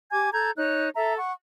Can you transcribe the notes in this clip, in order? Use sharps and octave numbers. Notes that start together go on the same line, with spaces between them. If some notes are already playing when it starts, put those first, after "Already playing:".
G4 G#5 D6 G#6
A4 A#5 G6 G#6
D#4 C#5 F#6
A4 E5 A#5
F#5 C#6